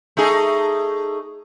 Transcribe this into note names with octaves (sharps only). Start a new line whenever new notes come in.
A3 D#4 G#4